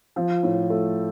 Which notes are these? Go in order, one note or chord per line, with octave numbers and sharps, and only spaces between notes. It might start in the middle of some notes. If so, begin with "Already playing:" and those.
F3
A2
A3